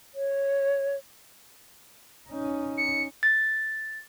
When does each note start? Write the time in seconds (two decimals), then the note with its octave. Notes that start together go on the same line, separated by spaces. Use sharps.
0.14 C#5
2.29 C#4 D#4
2.77 C#7
3.23 A6